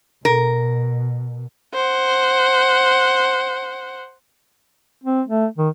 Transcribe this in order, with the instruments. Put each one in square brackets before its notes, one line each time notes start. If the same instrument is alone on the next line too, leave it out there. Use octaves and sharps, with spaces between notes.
[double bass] B2 [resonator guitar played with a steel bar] A#4
[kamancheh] C5 F#5
[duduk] C4
A3
D#3